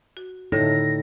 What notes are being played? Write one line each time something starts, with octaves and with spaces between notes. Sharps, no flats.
F#4
A2 D3 D#4 E4 A4 A#6